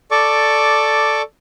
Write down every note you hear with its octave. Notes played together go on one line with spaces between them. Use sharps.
A4 D5 C#6 D6